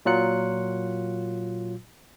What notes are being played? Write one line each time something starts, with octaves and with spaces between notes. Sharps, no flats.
A#2 F#3 F4 F#6 C#7